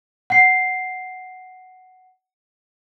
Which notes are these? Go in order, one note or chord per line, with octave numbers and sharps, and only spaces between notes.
F#5 C7